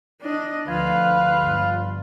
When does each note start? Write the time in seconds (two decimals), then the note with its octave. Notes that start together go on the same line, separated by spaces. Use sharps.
0.21 D4 D#5
0.68 D2 D3 F3 F4 B4 F5
1.42 G1